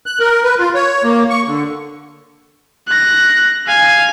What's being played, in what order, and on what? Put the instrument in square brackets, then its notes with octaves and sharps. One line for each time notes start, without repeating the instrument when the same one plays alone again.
[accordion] F#6
A#4
B4
F4
C#5
A#3
C#6
D3
[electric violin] F#6 A#6
F5 G#5